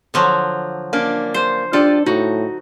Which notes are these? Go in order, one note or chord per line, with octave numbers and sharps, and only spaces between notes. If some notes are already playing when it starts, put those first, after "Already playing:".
D3 F3 F#3
A#3 C#4 D4
C5
D4 F4 G4 A4 D5
A2 D#4 F#4